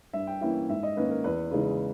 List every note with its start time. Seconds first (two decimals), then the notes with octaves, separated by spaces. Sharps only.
0.13 G2 E5
0.27 G5
0.41 E3 A#3 C#4 E4 E5
0.69 G#2 E5
0.83 D#5
0.97 D#3 A#3 C#4 B4
1.10 A#4
1.24 E2 B4
1.51 C#3 E3 G#3 D#4